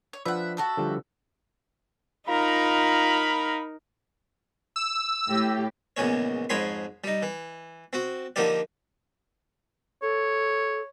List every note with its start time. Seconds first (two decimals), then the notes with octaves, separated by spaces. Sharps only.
0.13 C#5
0.25 F3 D4 B4 E5 F#5
0.57 F#4 A4 E5
0.77 D3 F3 G3
2.28 D#4 F4 A#4 F5 A#5 B5
4.76 E6
5.29 A2 G4
5.96 A#1 E2 C#3 G#3 C#5
6.49 F2 G#2 G#4 C#5 B5 C6
7.04 G3 D#4
7.22 E3
7.93 C4 F#4
8.36 D3 F3 A#3 D#4 G4 D5
10.02 A4 C#5